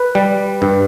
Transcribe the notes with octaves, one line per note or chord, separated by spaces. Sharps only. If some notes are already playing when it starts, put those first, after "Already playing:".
Already playing: B4
G3
G2